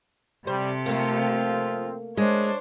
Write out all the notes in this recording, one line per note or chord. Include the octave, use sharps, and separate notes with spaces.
C3 G3 G4 A4 C5
F3 A3 A#3 C4 F4
G#3 D4 C5 C#5